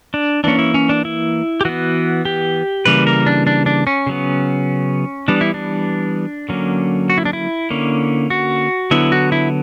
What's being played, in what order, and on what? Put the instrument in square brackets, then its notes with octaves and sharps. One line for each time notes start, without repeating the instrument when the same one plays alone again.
[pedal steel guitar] D4
E3 A#3 C#4 D4
E4
C#4
D4
E4
G4
E3 B3 F#4
G4
C#3 E3 G3 A#3 B4
A#4
D4
D4
D4
C#4
C#3 F#3 B3
E3 G3 B3 D4
E4
D4
D3 F#3 A#3 C#4
F#4
E4
D4
E4
D3 A#3 C#4
F#4
D3 F#3 B3 E4
F#4
E4